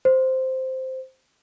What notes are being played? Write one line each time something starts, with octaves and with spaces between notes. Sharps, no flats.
C5